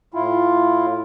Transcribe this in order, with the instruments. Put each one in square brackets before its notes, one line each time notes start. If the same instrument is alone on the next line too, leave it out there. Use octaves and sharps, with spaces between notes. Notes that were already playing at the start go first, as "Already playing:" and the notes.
[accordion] A2 E4 F4